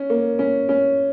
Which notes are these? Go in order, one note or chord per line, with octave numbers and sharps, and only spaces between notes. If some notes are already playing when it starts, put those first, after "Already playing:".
Already playing: C#4
A#3
C#4
C#4